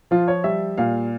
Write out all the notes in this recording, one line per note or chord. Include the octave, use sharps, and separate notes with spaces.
F3 F4
C#5
G3 E5
A#2 F5